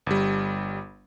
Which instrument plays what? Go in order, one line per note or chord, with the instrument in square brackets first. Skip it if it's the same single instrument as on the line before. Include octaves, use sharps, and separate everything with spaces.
[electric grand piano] G1 G3